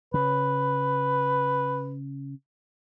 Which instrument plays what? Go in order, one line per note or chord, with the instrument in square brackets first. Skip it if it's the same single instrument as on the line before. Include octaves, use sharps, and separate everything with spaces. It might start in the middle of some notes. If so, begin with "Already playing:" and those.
[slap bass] C#3 [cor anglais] B4